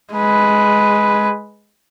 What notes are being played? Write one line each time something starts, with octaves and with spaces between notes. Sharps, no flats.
G#3 B4